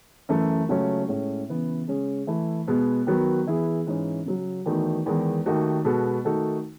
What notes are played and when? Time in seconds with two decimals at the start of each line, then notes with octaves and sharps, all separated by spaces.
0.29 F#2 E3 A3
0.69 C#2 C#3 F#3 A3 C#4
1.08 A2 G#3 C#4
1.48 C#3 E3 B3
1.87 C#3 G#3 C#4 G#4
2.27 E3 A3 E4
2.67 B2 G#3 B3
3.07 D#3 F#3 B3 F#4
3.47 E3 B3 E4 G#4
3.86 G#2 E3 G#3 C#4
4.26 C#3 F#3 C#4
4.66 E2 D#3 A3 D#4 F#4
5.06 E2 D#3 G#3
5.46 D#2 D#3 A3 D#4 F#4
5.84 B2 G#3 B3 F#4 A4
6.24 D#3 A3 D#4 F#4 A4